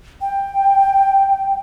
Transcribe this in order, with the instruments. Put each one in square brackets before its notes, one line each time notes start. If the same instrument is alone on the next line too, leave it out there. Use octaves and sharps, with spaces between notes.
[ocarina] G5